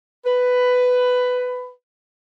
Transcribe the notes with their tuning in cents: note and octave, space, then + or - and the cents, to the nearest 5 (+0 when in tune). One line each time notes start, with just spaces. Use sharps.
B4 +10